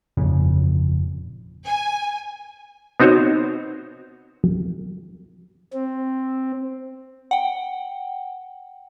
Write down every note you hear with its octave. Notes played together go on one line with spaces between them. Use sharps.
G1 F2 A#2 C#3
G#5
B3 C4 D#4 F#4 C5 C#5
C4
F#5 G5